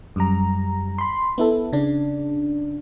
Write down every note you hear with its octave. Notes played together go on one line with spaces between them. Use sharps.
F#2 G3 A#5
B5 C6
B3 E4 A4
C#3 D4